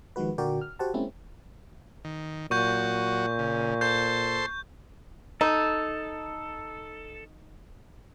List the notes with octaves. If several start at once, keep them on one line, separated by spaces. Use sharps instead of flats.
D#3 F3 G#3 F#4 B4
A#2 D3 F#4 A#4 D5 G5
F6
F#4 G4 C5 F#5 A5
G#3 A#3 C4 C#4 E4
D#3
A#2 F#3 F#4 C#6 G6
C#3
A4 C5 C6 G6
D#4 A4